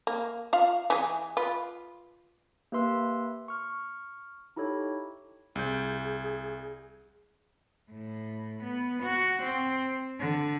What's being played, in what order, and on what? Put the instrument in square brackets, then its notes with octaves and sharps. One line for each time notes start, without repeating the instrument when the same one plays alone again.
[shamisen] A#3
F4 F5
E3 G#4
F4 B4
[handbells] A#3 G4 B4 E5 C6 E6
C#6 F6
D#4 E4 G4 A4 C#5
[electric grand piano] C2 G6 [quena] G#4
[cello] A2
B3
F#4
C4
D3